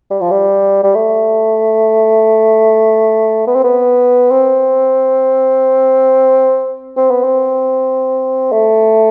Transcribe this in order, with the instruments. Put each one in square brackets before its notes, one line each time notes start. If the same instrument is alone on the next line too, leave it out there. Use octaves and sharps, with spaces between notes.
[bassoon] G3
F3
G3
G3
A3
B3
C4
B3
C4
C4
B3
C4
A3